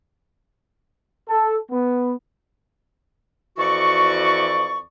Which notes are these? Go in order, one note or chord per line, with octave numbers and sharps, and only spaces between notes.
A4
B3
F2 E3 F#4 D5 C#6